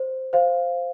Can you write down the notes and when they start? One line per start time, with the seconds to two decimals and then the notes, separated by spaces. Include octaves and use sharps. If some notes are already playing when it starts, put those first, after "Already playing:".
Already playing: C5
0.33 C5 F5